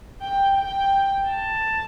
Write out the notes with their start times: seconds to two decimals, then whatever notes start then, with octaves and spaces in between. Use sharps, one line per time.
0.21 G5
0.57 G5
1.29 A5